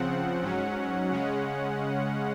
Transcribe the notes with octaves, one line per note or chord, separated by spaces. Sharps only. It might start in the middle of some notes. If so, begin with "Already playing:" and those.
Already playing: C#3 F3 C4 F#5
G#2 F#3 C#4
C#3 G#3 C#4